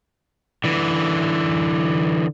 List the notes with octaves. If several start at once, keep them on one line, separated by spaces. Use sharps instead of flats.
D3 E3